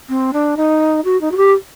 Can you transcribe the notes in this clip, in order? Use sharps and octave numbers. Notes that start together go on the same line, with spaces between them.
C4
D4
D#4
F#4
D#4
F#4
G4